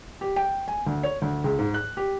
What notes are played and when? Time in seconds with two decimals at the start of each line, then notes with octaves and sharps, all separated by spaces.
0.21 G4
0.36 G5
0.68 G#5
0.87 D2
1.03 C#5
1.22 D2
1.44 C#2
1.59 G#2
1.74 F#6
1.97 G4